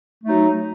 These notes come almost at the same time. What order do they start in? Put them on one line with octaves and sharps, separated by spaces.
A3 D#4 F#3